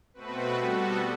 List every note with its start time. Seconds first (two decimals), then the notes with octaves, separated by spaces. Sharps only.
0.14 B2 A3 C4 F#4 B4
0.55 G3 B3 F#4 A4